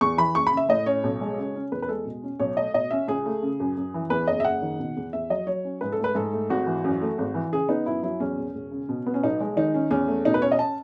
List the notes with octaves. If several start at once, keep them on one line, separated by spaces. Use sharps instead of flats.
E2 C#6
E3 B5
F#1 C#6
B5
C#3
E5
A2 D#5
C#4 C#5
B1
G#3
C#3
C#4
E2 B4
B4
G#3 A4
B2
C#4
B1 C#5
A3 D#5
B2 D#5
C#4 E5
C#2 G#4
A3
C#3
F#2
F#2
E3
E2 B4
F#1 D#5
E5
F#1 F#5
D#3
B2
E2
E2 E5
F#3 D#5
F#3 C#5
C#4
G#2 B4
A4
A3 B4
G#2 A4
A3
G#1 F#4
E3
F#2
A3
G#1
E3
C#3 G#4
B3 D#4
F#2 E4
F#3 E4
E2 C#4
E1
E1
C#3
B2
B3
C#4
B1 D#4
G#3
D#3 D#4
C#4
E2 C#4
A3
B2 D#4
B4
C#4 C#5
D#5
A5